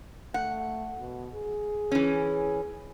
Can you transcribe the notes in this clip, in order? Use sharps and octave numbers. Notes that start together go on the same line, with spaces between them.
A3 F#5
B2
G#4
E3 C#4